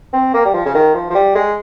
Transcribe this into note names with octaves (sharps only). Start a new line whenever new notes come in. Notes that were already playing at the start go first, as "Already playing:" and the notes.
C4
A#3
G3
F3
C#3
D#3
F3
F3
G3
G#3